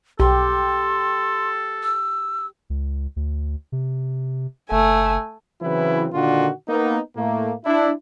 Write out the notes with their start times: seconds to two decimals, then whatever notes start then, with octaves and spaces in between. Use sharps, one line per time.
0.20 B1 G4 A4 C6
1.83 E6
2.70 C#2
3.16 D2
3.72 C3
4.71 F#1 A3 G#5
5.61 C#3 E3 F#3 C4 E4 B4
6.13 A#2 D3 D#3 D4 F4 F#4
6.69 A#3 B3 D#4
7.16 A2 A3 A#3
7.66 D4 E4